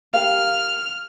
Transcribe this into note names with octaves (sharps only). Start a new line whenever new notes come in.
G4 A#4 F5 F6